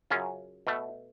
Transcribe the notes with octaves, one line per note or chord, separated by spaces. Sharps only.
F#2 C#3 F#3 C#4 F4
B2 A3